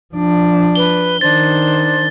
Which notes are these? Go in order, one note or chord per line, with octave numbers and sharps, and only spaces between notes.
F3 D4
B4 G7
D#3 D4 C5 A6